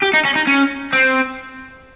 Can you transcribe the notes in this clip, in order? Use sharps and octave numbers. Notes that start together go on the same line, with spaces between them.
G4
D#4
C#4
D#4
C#4
C4